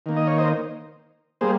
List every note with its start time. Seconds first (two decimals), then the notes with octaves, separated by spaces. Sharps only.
0.06 D#3 A#3
0.17 D#5
0.27 C#5
0.38 C5 D#5
1.41 G3 A#3 G#4 C5